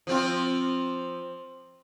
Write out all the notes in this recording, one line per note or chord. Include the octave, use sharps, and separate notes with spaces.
F3 C4 F4